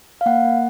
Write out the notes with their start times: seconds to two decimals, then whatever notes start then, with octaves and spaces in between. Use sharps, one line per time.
0.21 F5
0.26 A#3 F#5
0.45 A#3